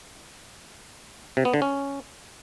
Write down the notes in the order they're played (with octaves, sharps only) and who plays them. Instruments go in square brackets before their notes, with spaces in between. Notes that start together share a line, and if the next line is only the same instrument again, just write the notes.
[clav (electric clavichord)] C3
B3
D3
C#4